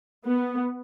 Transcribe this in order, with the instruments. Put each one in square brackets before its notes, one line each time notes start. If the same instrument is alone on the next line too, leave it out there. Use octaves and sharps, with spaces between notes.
[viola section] B3